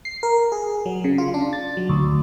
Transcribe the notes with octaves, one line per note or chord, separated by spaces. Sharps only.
C7
A#4
G#4
F#3
C#3
F4
D4
A6
F#3
D2